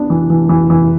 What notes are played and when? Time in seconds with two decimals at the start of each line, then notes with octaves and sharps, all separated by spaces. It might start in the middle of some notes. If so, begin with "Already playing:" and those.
Already playing: B3 D4
0.10 E3
0.30 E3
0.49 E3
0.70 E3